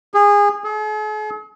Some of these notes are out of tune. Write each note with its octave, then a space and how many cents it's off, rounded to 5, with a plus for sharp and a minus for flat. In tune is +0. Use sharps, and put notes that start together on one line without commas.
G#4 -25
G#4 +45